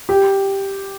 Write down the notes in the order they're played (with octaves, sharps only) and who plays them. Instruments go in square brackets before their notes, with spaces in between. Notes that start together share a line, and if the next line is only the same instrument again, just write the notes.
[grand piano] G4